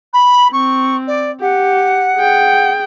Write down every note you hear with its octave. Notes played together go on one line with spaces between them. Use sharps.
B5
C4 C#6
D5
G4 F#5
G#4 G5